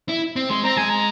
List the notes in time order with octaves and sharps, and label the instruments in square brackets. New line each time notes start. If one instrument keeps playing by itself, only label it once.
[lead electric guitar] E4
C4
[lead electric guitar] G#3 [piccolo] C6
[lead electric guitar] C4 [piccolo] A#5
[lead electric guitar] G#3 [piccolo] G#5
[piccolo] A#5